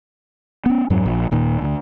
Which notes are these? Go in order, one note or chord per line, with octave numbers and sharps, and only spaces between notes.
B3 C#4
F2 G#2 F#3
A#1
D#1 A#2 D#3
D2 D3